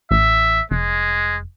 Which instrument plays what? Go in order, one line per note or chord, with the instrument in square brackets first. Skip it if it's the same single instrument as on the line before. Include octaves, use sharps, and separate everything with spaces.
[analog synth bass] A1 [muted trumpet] E5
[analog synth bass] F1 [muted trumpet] G#3